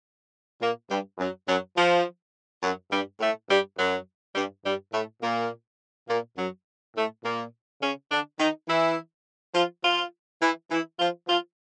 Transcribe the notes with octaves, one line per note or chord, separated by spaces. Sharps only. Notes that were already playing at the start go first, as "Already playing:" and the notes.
A#2 A#3
G2 G3
F#2 F#3
F#2 F#3
F3
F#2 F#3
G2 G3
A2 A3
G2 G3
F#2 F#3
G2 G3
G2 G3
A2 A3
A#2 A#3
A#2 A#3
F#2 F#3
A2 A3
A#2 A#3
C#3 C#4
D3 D4
D#3 D#4
E3 E4
F3 F4
F3 F4
E3 E4
E3 E4
F3 F4
F3 F4